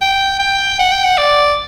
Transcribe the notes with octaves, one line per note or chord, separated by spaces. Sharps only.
G5
G5
F#5
G5
F#5
D5